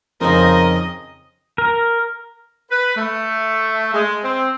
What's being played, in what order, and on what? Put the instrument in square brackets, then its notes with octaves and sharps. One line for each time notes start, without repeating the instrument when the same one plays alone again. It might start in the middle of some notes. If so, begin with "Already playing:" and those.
[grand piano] F2 [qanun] C#3 D#4 C5 [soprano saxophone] A#4 [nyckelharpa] D#5
[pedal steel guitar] A#4
[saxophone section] B4
A3
G#3
C4